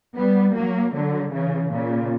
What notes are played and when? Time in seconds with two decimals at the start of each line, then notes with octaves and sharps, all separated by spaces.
0.16 G3 B3
0.55 F#3 A#3
0.93 D3 F#3
1.32 C#3 E3
1.71 A#2 C#3